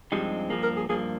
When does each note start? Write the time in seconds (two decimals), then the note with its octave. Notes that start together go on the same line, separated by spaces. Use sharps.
0.12 G2 F3 G#3 C4 D#4 G4
0.50 G2 F3 A#3 G#4
0.63 A#4
0.77 G#4
0.89 G2 F3 A#3 G#4